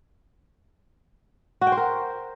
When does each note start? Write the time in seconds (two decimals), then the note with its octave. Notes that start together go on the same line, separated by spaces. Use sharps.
1.61 F#4
1.67 G5
1.72 C5
1.77 A#4